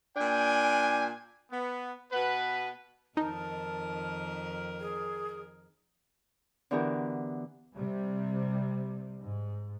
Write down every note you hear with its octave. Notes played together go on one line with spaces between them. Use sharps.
A#2 D4 G5 G#5
B3
B2 B3 B4
F2 D#3 D#4 A#4 A5
G#4
D3 E3 B3 F#4 G4 A#4
C3 G3
G#2